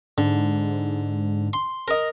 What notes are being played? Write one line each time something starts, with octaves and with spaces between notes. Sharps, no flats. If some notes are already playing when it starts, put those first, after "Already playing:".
G#2 D3
C6
A#4 D#5